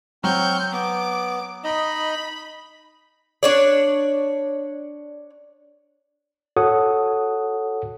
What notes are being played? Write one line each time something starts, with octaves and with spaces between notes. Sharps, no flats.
F#3 C4 C#6 F6 G6
B3 D6
D#4 D#5 B5
D4 C#5 D5
F#4 A4 C#5 F#5 D#6